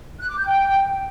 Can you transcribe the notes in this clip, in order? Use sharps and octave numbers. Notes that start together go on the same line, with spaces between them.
F#6
D6
G6
G5